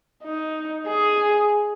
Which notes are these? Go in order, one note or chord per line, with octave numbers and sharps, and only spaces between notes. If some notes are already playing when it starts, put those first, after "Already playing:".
D#4
G#4